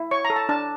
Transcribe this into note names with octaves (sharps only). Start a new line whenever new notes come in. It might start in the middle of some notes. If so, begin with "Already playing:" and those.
Already playing: E4
C#5 C#6
A#5
A4
A5
D4 A5